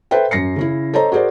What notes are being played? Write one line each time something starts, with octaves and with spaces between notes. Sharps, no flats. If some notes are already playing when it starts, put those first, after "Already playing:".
A4 B4 C5 E5 G5
F#2 A#6 C7 C#7
C#3 C#4 E4
A4 C5 C#5 D#5 A#5
F#4 G#4 A#4 C5 D5